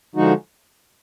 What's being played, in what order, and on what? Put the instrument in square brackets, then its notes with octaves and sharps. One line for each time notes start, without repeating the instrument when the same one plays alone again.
[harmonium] D3 F3 G#3 D#4 F#4